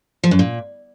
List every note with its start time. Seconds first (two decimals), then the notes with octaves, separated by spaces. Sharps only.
0.24 F3
0.31 F#2
0.39 A#2